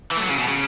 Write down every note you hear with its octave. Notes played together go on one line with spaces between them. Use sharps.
E3
A3
F#3
C#3
B2
C#3